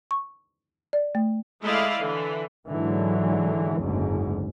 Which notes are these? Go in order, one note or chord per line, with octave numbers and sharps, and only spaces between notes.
C#6
D5
A3
G#3 A3 E4 D5 D#5 F5
D3 E3
G#2 D3 E3 F#3
F#1 D2 G#2